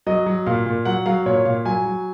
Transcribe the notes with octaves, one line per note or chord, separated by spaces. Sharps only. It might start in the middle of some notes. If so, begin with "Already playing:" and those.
F#3 D#5
F#3
A#2 F5
A#2
F#3 F#5
F#3 F5
A#2 C#5
A#2 F5
F#3 G#5
F#3